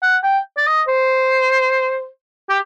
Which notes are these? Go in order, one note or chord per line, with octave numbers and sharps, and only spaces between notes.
F#5
G5
D5
D#5
C5
G4